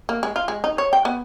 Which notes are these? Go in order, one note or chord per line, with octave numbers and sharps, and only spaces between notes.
A#3
G#3
F4
G#3
D#4
C#5
G5
B3